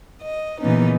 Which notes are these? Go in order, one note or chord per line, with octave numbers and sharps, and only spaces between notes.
D#5
A#2 C#3 E3 B3 C#4 D#4